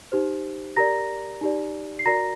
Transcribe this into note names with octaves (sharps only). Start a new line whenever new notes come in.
D#4 G4 C5
G4 A#4 D5 A#5 A#6
D#4 G4 D5
C7
F#4 A#4 D5 A#5 A#6